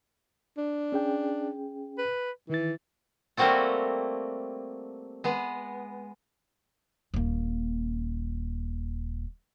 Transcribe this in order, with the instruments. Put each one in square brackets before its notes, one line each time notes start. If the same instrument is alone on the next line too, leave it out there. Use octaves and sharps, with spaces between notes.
[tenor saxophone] D4
[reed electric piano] C#4 G#4 G5
[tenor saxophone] B4
[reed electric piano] D#3 A6 [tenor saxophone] E3
[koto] G3 A3 A#3 C4 F#4 A4
G#3 B3
[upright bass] D#1 A#3